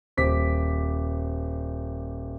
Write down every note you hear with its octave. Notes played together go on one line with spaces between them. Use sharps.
D#1 C5 D6 B6